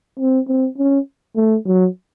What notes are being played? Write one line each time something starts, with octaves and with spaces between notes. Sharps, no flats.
C4
C4
C#4
A3
F#3